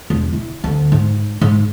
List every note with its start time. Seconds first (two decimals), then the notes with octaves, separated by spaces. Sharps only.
0.10 E1
0.33 E4
0.64 D2
0.92 G#2
1.41 G#2